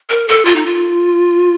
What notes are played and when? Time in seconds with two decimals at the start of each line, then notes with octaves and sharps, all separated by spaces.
0.10 A#4
0.28 A4
0.45 F4
0.56 D#4
0.66 F4